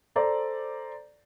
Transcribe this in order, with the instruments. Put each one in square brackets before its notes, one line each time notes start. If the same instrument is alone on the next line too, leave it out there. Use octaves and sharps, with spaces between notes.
[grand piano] A4 C5 D5 A#5